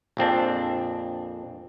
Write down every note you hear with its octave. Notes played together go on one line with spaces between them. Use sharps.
A#1 F2 C4 D4